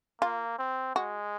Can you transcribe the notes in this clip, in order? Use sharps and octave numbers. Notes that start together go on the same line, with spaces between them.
A#3 F4
C4
G#3 F#4